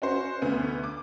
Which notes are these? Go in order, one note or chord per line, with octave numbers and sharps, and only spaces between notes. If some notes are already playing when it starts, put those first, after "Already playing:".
C#4 F#4 C5
D2 B3
D6